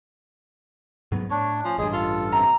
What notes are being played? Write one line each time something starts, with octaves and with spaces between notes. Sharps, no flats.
G#2 F#3 B3
A2 D4 C#5
F3 C#4
A1 G2 G#3 G#4
F4 A4
C3 A#5